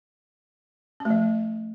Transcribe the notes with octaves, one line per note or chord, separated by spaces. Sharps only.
C#4
A3
F3